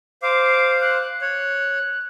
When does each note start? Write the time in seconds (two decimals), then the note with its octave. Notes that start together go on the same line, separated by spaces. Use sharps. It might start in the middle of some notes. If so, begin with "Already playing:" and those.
0.23 C5 F5 D6
0.81 F#6
1.22 C#5 F#6